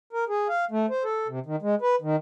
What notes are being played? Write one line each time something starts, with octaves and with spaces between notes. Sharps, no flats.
A#4
G#4
F5
A3
C5
A4
C3
D#3
G#3
B4
D#3